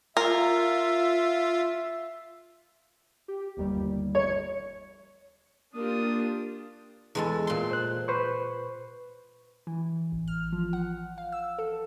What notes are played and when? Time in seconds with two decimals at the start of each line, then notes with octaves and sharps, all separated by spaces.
0.17 F4 A#4 E5
3.28 G4
3.57 G1 D#2 G3
4.15 C#5 G#6 C#7
5.75 A#3 D4 F4 G4 A#4 D#6
7.15 E2 G#3 A4
7.47 A#2 C6
7.71 C5 F#6
8.08 B4 C5 C#6
9.67 E3
10.12 A1
10.28 F6
10.52 F3
10.73 F#5
11.18 F5
11.32 E6
11.58 A4